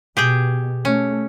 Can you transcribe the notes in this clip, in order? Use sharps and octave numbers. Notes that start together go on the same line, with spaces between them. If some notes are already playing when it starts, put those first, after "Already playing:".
B2 G4 G#4 G5
A3 C#4